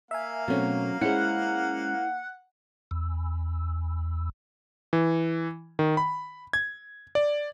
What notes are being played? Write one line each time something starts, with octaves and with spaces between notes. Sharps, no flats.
A#3 A#4 E5 F5 G#5
B2 F#3 A3 C4 C#4
G#3 C#4 E4 C5 F#5
E2
E3
D#3
B5
G#6
D5